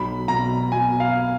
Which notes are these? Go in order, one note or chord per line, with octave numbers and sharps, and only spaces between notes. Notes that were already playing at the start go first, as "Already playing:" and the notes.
Already playing: B1 B5
B2 A#5
B2 G#5
F5